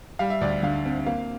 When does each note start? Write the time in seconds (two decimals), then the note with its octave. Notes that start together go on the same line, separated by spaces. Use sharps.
0.19 G3 F5
0.30 E5
0.41 D2 D5
0.63 D3 F5
0.86 C4
1.06 A#3 F5